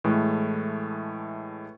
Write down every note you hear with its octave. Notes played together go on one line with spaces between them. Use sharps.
A2 E3 G#3 A3